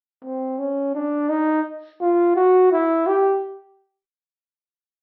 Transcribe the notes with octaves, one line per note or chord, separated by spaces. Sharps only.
C4
C#4
D4
D#4
F4
F#4
E4
G4